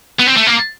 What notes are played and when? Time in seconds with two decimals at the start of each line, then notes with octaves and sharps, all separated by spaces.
0.20 B3
0.27 C4
0.37 A3
0.47 A#3